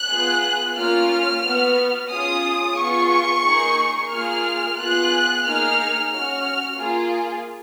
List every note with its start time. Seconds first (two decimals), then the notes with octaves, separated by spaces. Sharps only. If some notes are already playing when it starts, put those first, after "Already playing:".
Already playing: F#6
0.09 B3 F4 G#4
0.77 A#3 C#4 F4 F6
1.44 B3 F#4
2.10 C#4 F4 G#4 D#6
2.77 B3 F4 G#4 C#6
3.45 A#3 D#4 G#4
4.12 A#3 F4 G#4 F6
4.79 B3 F4 G#4 F#6
5.46 A#3 D#4 G#4 F6
6.13 C#4 F#4 F6
6.80 A#3 F4 G#4